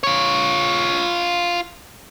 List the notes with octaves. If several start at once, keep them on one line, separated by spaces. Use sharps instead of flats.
F4 C#5